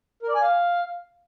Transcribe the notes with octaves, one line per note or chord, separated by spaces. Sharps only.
A#4
D5
G#5
F5